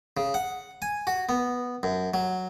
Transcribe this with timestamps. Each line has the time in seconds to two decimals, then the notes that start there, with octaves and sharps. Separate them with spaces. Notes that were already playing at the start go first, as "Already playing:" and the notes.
0.17 C#3
0.34 F#5
0.82 G#5
1.07 F#4
1.29 B3
1.83 F#2
2.14 F#3